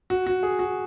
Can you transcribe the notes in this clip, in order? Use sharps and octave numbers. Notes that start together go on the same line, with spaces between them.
F#4
F#4
G#4
F#4